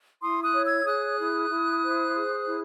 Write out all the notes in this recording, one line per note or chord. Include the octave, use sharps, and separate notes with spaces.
E4 C6 D#6
D#6 F#6
C#5
E6 G#6
E6
G#4 D#6 F#6
E4
E4
C5
G#4
E4